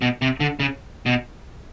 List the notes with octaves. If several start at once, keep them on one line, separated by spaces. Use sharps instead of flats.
B2
C3
D3
C#3
B2